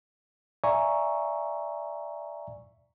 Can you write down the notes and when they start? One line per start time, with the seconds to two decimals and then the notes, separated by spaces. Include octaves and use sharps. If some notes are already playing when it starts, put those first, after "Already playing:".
0.64 D5 E5 F5 G#5 A#5 C#6